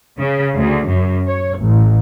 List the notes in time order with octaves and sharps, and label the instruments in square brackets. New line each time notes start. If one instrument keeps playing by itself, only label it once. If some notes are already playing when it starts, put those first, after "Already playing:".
[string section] C#3
D2
F#2
C#5
A1